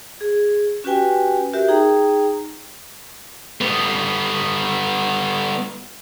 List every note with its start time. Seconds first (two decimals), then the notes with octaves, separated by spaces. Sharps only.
0.21 G#4
0.84 C#4 F#4 G4 B4 G5 G#5
1.53 F#4 G4 A#4 E5
1.68 D#4 G#4 G5 A#5
3.61 G3 B3